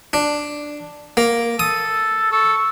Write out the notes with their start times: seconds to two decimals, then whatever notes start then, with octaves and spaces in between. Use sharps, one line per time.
0.13 D4
1.17 A#3
1.59 A4 D#6
2.32 A4 C#6